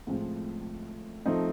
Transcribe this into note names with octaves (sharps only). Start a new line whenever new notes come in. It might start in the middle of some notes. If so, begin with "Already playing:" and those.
A2 F3 G#3 C4
F3 A3 C4 D#4